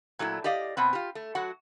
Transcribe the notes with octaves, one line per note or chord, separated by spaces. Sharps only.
A#2 F#3 A3 E4
G4 D5 D#5 F5
B2 B3 C4
F4 G4
A3
F#3 F#4 F#5